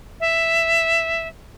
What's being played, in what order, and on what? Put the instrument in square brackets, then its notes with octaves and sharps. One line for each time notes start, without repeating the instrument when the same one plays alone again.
[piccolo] E5